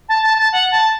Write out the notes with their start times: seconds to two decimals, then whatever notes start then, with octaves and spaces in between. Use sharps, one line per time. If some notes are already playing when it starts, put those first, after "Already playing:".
0.09 A5
0.23 A5
0.38 A5
0.52 F#5
0.71 A5